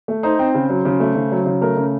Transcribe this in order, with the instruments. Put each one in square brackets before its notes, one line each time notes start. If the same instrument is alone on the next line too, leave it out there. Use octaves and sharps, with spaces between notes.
[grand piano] A3
D#4 C5
C4
C#3
F#3
C#3
A3
C#3
F#3
C#3
A3 A#4
C#3